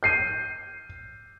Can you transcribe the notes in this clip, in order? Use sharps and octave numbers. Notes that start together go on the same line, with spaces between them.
G6 C7 D#7